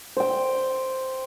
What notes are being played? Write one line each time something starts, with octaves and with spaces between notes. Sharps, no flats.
C5 G5